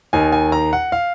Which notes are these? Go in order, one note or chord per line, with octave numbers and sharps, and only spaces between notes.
D#2 D#3 G#5
G#5
A#5
F#5
F5